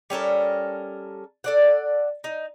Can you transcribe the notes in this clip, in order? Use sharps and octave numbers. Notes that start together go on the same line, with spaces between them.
G3 C#4 A4 A#4
A4 D5 F#5
D#4